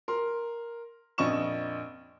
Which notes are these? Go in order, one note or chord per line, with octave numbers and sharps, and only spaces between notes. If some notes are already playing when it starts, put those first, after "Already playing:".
A#4 C6
A#1 F2 D#5 C#6 E7